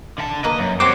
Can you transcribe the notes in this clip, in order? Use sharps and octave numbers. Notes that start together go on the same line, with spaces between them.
D3 A5
A#3 B4 D#5
F#2
C4 F#4 G4 C5 C#5 D6